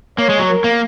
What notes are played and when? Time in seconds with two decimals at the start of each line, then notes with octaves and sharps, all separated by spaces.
0.18 A#3 C#5
0.29 G#3
0.39 F#3
0.49 A#4
0.64 A#3